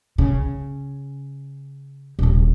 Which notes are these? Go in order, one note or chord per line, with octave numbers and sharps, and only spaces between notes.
C#3
D#1 D2